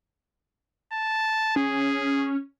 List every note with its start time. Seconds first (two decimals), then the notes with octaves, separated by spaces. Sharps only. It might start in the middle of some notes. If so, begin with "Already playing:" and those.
0.93 A5
1.56 C#4 G#4